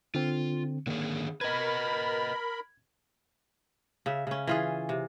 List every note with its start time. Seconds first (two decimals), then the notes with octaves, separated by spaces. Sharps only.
0.15 D3 C4 F4
0.87 D3 D#3 A#3 G#4
1.41 A#4 B4 D#5 B5 G#6
4.06 C#3 E5
4.27 C#3 C#4
4.47 E3 F4 G#4
4.89 C3